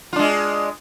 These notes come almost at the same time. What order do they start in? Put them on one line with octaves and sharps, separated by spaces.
F4 D4 G#3